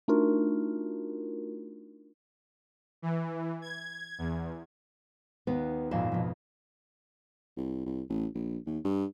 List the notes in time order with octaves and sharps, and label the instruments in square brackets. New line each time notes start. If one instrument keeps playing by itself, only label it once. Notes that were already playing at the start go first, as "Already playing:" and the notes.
[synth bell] A3 D4 D#4 F4 F#4 A#4
[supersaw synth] E3
G#6
E2
[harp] D#2 [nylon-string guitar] B3
[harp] G#1 F2 E7 [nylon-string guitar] A#2
[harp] F2 B2
[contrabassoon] C2
C2
A1
A#1
D#2
G2